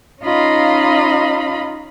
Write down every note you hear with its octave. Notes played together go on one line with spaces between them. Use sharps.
C#4 D#4 F4 D#5 F5 B5